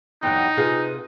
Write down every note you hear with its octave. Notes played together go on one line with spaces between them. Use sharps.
E2 G2 F#3 D#4 G5
C3 F4 G#4 B4